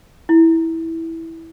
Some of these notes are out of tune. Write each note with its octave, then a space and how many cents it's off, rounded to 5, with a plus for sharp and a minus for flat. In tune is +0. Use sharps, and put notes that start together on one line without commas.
E4 -10